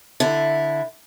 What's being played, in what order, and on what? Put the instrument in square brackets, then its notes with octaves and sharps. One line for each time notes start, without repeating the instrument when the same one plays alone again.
[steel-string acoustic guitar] D3 E4